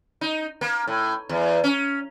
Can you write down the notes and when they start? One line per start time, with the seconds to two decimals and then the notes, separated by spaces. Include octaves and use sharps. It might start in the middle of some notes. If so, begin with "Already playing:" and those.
0.21 D#4
0.61 A#3
0.87 A2
1.29 E2
1.64 C#4